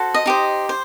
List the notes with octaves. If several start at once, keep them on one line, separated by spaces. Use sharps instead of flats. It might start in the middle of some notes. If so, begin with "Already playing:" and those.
Already playing: F#4 A4 C5
D#5
D#4 G4 C5
C5